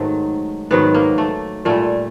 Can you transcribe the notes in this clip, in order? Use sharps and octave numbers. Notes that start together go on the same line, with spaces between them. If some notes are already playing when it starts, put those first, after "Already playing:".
Already playing: G#2 D#3 F#3 A3
G#2 D#3 F#3 B3
A#3
A3
A#2 G3 A3